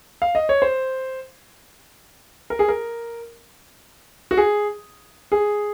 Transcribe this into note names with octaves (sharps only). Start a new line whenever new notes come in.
F5
D#5
C#5
C5
A#4
G#4
A#4
F#4
G#4
G#4